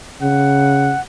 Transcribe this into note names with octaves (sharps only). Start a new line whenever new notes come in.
C#3 F#5